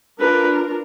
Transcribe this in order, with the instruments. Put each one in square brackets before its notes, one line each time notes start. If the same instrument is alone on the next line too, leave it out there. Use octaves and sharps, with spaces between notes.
[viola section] D4 F4 A#4 [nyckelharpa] B4